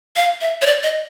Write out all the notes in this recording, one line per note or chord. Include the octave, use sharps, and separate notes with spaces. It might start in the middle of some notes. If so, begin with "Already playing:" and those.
F5
E5
C#5
D5
D#5